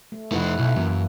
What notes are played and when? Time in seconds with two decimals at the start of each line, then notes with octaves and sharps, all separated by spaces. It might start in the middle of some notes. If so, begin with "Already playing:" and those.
0.12 A3
0.32 F2 A3 E4 B4 F#5
0.59 B1 E4
0.76 F#2 E3 A#3